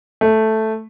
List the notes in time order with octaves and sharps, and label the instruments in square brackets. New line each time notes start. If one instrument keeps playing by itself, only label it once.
[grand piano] A3